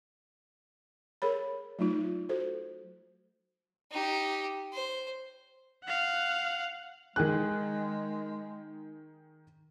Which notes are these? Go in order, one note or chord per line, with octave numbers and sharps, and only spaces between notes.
G#4 A#4 C#5 B5
F#3 A3 D#4 F4
F#4 A4 C5
D#4 G4
C5
F5 F#5
D#3 G#3 G#4 F#6